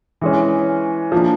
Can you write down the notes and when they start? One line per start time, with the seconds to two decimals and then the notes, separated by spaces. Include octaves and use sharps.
0.21 E3 G#3 C#4
1.12 F3 A#3 D4